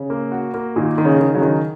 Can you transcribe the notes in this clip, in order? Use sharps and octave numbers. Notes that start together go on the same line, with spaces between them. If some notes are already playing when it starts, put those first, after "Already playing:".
Already playing: C#3
A#3
F#4
A#3
A#2 D#3
D#3
C#3
D#3
C#3 F#3
D#3